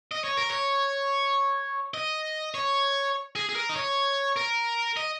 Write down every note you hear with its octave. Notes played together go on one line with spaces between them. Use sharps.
D#5
C#5
A#4
C#5
D#5
C#5
G#4
G#4
A#4
D#5
C#5
A#4
D#5